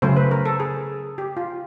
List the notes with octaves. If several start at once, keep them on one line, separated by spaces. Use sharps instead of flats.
C#3 F#3 A3 C#4 C5
B4
A#4
A4
G#4
G4
F4